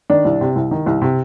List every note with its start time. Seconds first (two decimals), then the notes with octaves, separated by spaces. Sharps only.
0.10 D#3 D4
0.25 C2
0.41 C3
0.56 C2
0.71 D#3
0.86 C2
1.02 C3